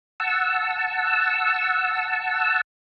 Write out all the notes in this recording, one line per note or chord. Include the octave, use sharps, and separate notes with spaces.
F#5 A5 E6